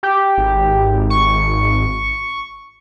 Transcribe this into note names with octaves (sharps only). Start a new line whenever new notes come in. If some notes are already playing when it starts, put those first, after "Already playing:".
G4
G#1
C#6